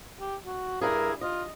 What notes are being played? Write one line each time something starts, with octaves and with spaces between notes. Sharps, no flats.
G4
F#4
G2 E4 G#4 A#4
F4 D#5